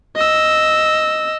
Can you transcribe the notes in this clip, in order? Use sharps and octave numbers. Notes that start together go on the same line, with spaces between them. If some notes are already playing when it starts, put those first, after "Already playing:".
D#5 E6